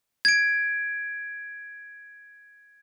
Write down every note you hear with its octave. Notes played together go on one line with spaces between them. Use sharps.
G#6 D7